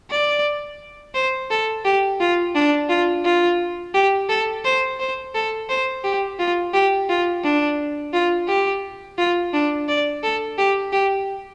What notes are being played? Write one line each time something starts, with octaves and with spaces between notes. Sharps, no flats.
D5
C5
A4
G4
F4
D4
F4
F4
G4
A4
C5
C5
A4
C5
G4
F4
G4
F4
D4
F4
G4
F4
D4
D5
A4
G4
G4